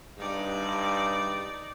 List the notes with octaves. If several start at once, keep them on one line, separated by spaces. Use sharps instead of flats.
G2 D#4 D5